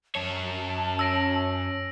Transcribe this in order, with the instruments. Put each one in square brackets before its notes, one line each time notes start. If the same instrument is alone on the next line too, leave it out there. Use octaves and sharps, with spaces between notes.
[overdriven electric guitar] F#2 C#5 [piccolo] A5
[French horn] C#4 [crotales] E6 A#6 D7